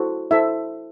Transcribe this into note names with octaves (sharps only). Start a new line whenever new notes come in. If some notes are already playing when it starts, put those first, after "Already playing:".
Already playing: E4 F#4 A4 C5
E4 A4 C5 E5